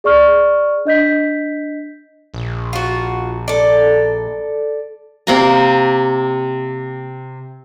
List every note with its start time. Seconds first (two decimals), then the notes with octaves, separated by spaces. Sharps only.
0.04 G#4 D5 C#6 F6
0.85 D4 D#5 G6 B6
2.34 A#1
2.73 F4 F#4
3.48 A4 D5
5.27 C3 A#3 A#5